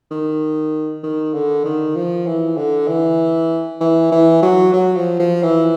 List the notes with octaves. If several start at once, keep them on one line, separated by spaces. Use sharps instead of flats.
D#3
D#3
D3
D#3
F3
E3
D3
E3
E3
E3
F#3
F#3
F3
F3
E3